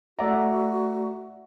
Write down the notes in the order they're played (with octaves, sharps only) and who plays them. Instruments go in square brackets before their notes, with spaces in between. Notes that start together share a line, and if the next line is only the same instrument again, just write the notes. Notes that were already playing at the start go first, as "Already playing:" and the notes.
[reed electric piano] A3 D5 A#5 [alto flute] F#4 [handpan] E5 F#5